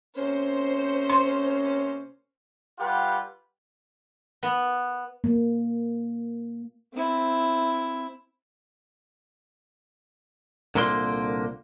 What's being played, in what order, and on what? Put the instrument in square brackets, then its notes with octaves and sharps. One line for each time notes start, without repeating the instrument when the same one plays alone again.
[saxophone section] C3 A#3 C#4 [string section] C5
[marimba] C6
[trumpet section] G3 F4 G4 B4 F#5 C6
[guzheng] B3
[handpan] A#3
[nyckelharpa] C4 E4
[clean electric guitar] C2 A#2 D3 A#3 C6